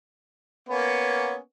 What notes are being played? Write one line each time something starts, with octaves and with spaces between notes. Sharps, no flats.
A#3 B3 C#4